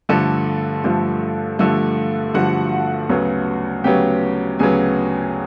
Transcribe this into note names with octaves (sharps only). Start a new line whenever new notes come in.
G2 D3 F3 A3 A4 A5
G2 D3 F3 A3
G2 D3 F3 A3
G2 D3 F3 A3 F#4 F#5
D2 C#3 F#3 B3
D2 C#3 F#3 B3 G4 G5
D2 C#3 F#3 B3 G#4 G#5